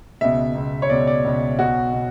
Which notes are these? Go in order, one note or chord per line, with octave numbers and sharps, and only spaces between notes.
C#2 B2 E5
C#2 B2
C#5
C#2 B2 D5
D5
C#2 B2
B1 B2 F#4
B2